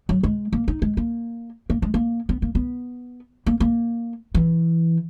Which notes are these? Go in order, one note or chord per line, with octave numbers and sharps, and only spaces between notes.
F#3
G#3
A#3
D#4
G#3
A#3
A#3
G#3
A#3
B3
A#3
B3
A#3
A#3
E3